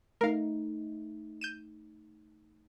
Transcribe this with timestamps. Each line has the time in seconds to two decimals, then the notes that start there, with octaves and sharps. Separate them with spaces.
0.21 A3 D#4 A#4 F5
1.41 G6 D#7 E7